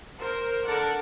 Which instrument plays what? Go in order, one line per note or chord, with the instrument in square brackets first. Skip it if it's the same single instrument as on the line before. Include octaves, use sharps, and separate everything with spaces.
[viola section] A#4 C5
D3 A#4 D5 F#5 A5